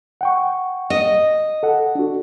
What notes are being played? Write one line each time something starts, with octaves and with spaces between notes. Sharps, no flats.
F#5 G5 C#6
D#5
A4 F#5
D4 F#4